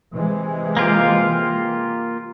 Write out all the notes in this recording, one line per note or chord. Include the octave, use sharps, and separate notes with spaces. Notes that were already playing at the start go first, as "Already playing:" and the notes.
C3 E3 G#3
A#3 F4 G4